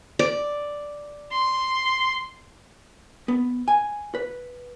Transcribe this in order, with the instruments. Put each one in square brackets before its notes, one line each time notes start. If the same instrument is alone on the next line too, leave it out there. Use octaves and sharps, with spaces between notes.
[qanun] D5
[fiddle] C6
[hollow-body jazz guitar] B3
G#5
B4